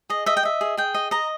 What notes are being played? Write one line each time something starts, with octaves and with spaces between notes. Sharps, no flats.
G#4 D#5
D#5 E5
G5
D#5 E5
G#4
G#4 G5
D#5
D#5 A#5